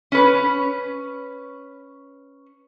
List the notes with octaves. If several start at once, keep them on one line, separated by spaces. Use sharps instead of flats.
C#4 B4